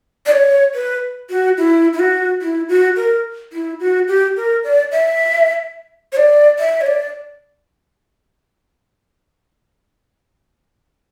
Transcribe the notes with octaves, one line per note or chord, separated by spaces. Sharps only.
D5
C#5
B4
F#4
E4
E4
F#4
E4
F#4
A#4
E4
F#4
G4
A#4
D5
E5
C#5
D5
E5
C#5
D5